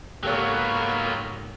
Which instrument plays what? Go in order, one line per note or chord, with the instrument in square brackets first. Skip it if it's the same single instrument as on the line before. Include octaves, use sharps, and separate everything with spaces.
[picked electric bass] C#2 G#2 [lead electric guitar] F#3 B3 [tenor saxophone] A#3 [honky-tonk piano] G4 A4 C#5